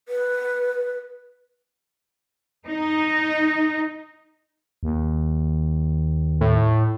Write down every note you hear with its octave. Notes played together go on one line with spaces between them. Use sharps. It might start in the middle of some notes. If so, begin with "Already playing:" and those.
B4
D#4
D#2
A2